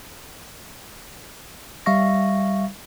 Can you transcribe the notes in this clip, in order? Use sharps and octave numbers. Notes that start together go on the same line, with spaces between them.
G3 E5 F5 C#6 A#6